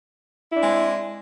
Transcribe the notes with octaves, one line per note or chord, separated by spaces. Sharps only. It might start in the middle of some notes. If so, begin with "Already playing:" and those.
G#3 C4 D4 E4